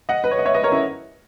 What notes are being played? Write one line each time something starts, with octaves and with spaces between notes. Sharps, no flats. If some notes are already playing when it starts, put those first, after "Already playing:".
D#5 F#5
B4
C#5
D#5
C#5 E5
B4 D#5
A#4 C#5
C#4 E4